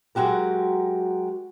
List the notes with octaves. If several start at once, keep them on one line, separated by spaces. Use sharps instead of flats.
F#3 G#3 F#4 G4 A#4